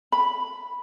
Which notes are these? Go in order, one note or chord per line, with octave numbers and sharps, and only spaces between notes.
B5